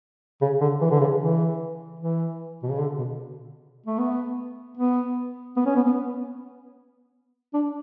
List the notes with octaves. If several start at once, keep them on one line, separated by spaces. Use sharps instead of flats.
C#3
D3
E3
D3
C#3
E3
E3
B2
C#3
D3
B2
A3
B3
B3
B3
C#4
B3
B3
D4